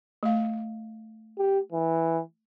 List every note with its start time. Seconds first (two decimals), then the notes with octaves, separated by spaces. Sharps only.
0.23 A3 F5
1.38 G4
1.72 E3